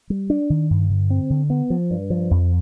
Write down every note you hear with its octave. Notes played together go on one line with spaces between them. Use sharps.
G3
D4
D#3
G2
D3
C4
D3
B3
F3
G2
F3
F2